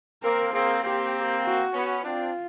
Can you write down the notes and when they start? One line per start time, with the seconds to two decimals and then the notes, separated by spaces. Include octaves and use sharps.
0.23 A#3 C4 A#4
0.53 A#3 C4 G#4
0.83 A#3 C4 G4
1.43 F#4
1.73 B3 C#4
2.03 C4 D4 F4